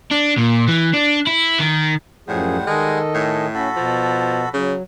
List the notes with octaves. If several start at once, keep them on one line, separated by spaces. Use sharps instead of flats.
D4
A#2
E3
D4
E4
D#3
F#2 A2 F3 G3 G#4 C5 F#5
D#3 G#3 A4 D#5
A2 G#4
C#4 F#4 A4 B5
B2 F3
C#3 F#3